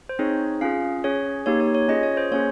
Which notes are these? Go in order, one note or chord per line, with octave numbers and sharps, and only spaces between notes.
C5
C4 D#4 G#4 C#5
C#4 F4 G#4 F5
C#4 G#4 C#5
A#3 D#4 G4 C#5
C#5
C#5
C#4 F4 G#4 D#5
C#5
C5
A#3 C#4 G#4 C#5